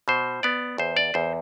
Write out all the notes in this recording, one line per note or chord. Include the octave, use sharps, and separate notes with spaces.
B2 C5
B3 D5
E2 C5
D5
E2 C5